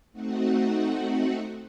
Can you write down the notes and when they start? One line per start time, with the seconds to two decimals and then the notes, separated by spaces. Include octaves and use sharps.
0.13 A3 C4 D#4 F#4 F#5